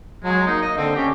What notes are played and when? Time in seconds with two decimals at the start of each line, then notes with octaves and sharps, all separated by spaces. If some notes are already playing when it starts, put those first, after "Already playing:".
0.24 F#3 G#3
0.47 A#3 D#4
0.62 D#5
0.77 D3 C4
0.96 C#4 G4